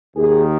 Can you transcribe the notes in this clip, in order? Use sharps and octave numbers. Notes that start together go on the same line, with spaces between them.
D#2 D#3 G#4